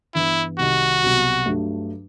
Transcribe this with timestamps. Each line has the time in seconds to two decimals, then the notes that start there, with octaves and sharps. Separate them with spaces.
0.14 G2 E3 B3 E4
0.59 C2 C3 D#3 G3 D#4 F#4
1.03 C2 B2 F#3
1.46 G2 F#3 A3